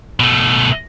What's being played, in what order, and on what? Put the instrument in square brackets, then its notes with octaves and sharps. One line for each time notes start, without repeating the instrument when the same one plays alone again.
[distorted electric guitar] B2 A3